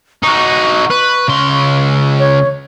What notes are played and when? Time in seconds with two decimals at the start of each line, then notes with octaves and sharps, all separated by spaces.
0.23 D#4 F#4 C#6
0.91 B4
1.29 C#2 C6
2.19 C#5